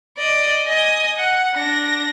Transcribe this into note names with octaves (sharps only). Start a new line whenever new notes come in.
D5 D#5
D#5 G#5
F#5
D4 A#6